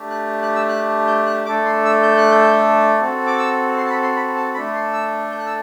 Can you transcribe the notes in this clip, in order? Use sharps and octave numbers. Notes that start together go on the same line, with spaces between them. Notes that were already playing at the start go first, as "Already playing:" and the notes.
Already playing: A3 D4 G4
F#6
F#6
E6
F#6
G6
F#6
A3 D4 A4 D6
C6
E6
G6
F#6
G6
C4 F#4 A4
D6
E6
C6
A5
B5
C6
B5
A5
A3 D4 A4 B5
C6
E6
G6
F#6
E6